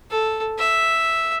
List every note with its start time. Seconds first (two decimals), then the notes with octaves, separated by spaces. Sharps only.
0.11 A4
0.58 E5